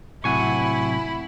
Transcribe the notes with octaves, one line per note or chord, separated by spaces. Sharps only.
A2 C3 F#3 E4 F#5 G#5 C#6